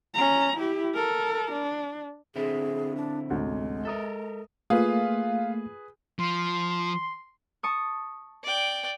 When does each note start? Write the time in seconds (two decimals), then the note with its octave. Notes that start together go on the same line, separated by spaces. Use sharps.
0.14 C#4 A#5
0.58 E4 G4
0.94 A4 A#4
1.52 D4
2.36 D3 C4 E4 G#4
2.96 D4
3.30 A1 D2 C3 G#3
3.85 A4 A#4 E5 A#5 D#6
4.70 A3 A#3 F4 G#4 B4
6.19 F3 C6
7.63 A5 C#6 D#6
8.44 D5 G5